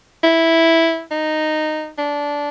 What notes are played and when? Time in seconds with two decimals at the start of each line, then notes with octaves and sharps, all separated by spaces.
0.24 E4
1.11 D#4
1.99 D4